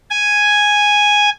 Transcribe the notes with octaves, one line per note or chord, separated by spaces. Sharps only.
G#5